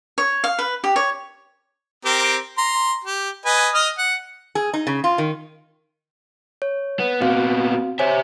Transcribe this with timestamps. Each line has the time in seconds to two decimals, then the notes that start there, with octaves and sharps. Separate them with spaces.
0.18 C#5
0.44 F5
0.59 B4
0.84 G4
0.96 C#5
2.05 C4 G4 A#4
2.58 A#5 C6
3.04 G4
3.46 B4 D#5 G#5
3.74 D#5 D#6 F6
3.98 F#5
4.55 G#4
4.73 D#4
4.87 C#3
5.04 F4
5.18 D#3
6.62 C#5
7.00 B3
7.22 A#2 B3 C4 F#4 F5
7.99 G4 C5 C#5 E5 G#5